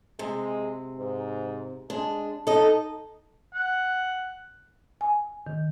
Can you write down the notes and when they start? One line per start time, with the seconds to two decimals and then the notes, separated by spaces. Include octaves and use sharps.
0.19 C3 G#3
0.98 G#2
1.90 G#3 D4
2.47 D#4 A4 D#5
3.54 F#5
5.01 G#5
5.47 D#3